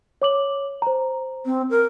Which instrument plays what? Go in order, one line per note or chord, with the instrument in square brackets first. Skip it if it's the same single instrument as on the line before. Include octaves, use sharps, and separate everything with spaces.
[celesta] C#5 D6 F#7
C5 A#5
[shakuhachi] C4
A#4